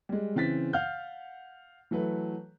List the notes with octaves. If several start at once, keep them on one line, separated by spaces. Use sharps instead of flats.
G3 G#3
C#3 E3 C4 A6 B6
F5 F#5 F6 G6
E3 F#3 A3 B4